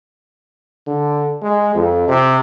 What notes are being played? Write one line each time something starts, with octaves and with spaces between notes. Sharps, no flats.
D3
G#3
F2
C3